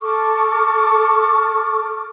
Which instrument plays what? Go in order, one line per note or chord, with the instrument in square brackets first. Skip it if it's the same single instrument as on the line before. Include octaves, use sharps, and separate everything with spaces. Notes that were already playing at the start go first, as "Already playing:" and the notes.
[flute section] A4 C#6 D6 F6